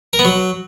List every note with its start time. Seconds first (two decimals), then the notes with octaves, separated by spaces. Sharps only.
0.13 A#4
0.19 B3
0.25 F#3